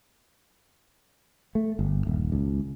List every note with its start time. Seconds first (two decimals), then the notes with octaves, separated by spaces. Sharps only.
1.55 A3
1.79 G1
2.07 D#1
2.32 C#2